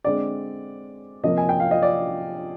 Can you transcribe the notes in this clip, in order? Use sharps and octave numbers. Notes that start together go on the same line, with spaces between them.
D3 G#3 C4 D5
C3 F3 A#3 D#5
G#5
G5
F5
D#5
D5